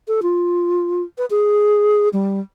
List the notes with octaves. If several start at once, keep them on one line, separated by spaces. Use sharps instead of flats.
A4
F4
B4
G#4
G3